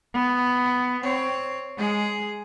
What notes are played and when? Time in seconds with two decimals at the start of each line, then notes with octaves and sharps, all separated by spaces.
0.14 B3
1.03 C4 C#5
1.77 G#3 G#4